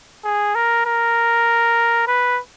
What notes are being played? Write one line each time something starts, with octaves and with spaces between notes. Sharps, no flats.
G#4
A#4
A#4
B4